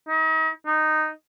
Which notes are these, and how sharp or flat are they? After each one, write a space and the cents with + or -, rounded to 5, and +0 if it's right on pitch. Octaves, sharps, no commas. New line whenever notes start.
D#4 +40
D#4 -10